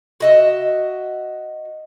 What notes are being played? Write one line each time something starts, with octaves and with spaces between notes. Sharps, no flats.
F#4 D#5 E5